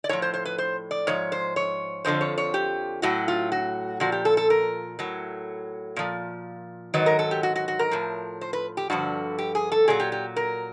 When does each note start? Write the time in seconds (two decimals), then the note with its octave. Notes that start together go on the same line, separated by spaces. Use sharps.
0.04 D5
0.09 A2 F3 C#5
0.22 C5
0.34 C5
0.45 B4
0.58 C5
0.91 D5
1.07 G#2 F3 C#5
1.32 C5
1.56 C#5
2.05 F2 D3 F3 C5
2.21 C#5
2.38 C#5
2.54 G4
3.02 A2 F#3 F#4
3.28 F4
3.52 F#4
4.00 A#2 F3 F#4
4.12 G4
4.25 A4
4.37 A4
4.50 A#4
4.99 A2 F#3
5.96 A#2 F3
6.94 G#2 D#3 F#3 B4
7.06 A#4
7.19 A4
7.31 G4
7.43 F#4
7.56 F#4
7.68 F#4
7.79 A#4
7.91 A2 F3
8.41 C5
8.53 B4
8.77 G4
8.90 G2 D3 F3 F#4
9.38 G4
9.55 G#4
9.72 A4
9.88 A#2 F#3 G#4
10.00 G4
10.12 G4
10.36 A#4